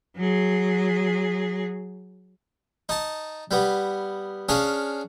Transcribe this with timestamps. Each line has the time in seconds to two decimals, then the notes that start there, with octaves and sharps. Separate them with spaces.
0.17 F#3 G#4
2.89 D#4 A5
3.51 G3 B3
4.49 C#4 D4 G#4 F5